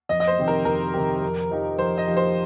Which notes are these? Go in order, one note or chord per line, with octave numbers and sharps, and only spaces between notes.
F2 D#5
D#5
C5
C3 D#3 C4 G4
A#4
F2 A#4
C3 D#3 C4 G4
F2
F3 D#4 G4
F2 C5
D#5
F3 D#4 G4
C5